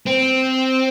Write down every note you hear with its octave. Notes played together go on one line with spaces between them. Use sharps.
C4